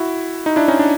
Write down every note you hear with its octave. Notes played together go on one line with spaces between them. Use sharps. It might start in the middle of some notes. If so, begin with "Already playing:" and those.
Already playing: E4 F#4
D#4
D4 E4
C#4 D#4
D4